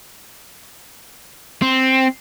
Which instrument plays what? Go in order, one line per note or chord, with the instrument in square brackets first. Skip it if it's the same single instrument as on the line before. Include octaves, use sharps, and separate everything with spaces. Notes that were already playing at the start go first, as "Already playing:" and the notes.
[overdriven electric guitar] C4